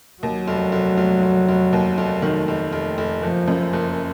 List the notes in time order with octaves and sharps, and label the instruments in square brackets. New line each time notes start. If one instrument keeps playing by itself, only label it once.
[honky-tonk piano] D#2 [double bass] F#3
[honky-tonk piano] F1
F1
F1
F1
F1
D#2
F1
D#3
F1
F1
F1
[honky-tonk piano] F#1 [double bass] F3
[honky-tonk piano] F#2
F#1